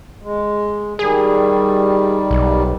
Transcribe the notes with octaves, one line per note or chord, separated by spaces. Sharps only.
G#3
D#3 G3 G#4
B1